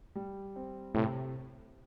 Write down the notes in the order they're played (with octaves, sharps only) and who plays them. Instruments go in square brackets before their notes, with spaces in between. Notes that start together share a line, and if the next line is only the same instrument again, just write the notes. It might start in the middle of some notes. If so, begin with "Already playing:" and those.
[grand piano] G3
C4
[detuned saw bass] A2 [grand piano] C3